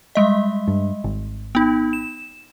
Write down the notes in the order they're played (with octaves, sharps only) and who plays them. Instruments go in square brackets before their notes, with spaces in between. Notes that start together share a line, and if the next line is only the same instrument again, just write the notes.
[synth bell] G3 G#3 D#5
[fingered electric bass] G2
G#1
[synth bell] B3 D#4
E7